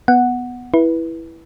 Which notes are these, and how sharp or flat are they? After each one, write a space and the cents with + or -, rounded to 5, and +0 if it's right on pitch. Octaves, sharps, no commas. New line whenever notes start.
B3 +0 F#5 +0
E4 +0 B4 -15